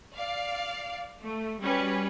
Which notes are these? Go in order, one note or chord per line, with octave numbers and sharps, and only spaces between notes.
D5 F5
A3
G3 C#4 F#4 G4 B4